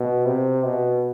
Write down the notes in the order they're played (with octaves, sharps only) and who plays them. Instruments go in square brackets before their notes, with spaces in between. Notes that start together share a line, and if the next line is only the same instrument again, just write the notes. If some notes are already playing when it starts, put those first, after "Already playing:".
Already playing: [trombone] B2
C3
B2